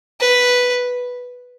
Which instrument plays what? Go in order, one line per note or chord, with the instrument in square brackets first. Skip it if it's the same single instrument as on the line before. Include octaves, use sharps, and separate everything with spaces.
[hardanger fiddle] B4